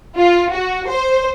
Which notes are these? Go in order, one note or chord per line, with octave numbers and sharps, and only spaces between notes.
F4
F#4
C5